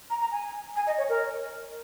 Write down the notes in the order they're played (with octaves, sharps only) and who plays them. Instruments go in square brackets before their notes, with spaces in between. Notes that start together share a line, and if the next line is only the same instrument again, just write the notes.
[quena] A#5
A#5
G#5
G#5
D#5
C#5
A#4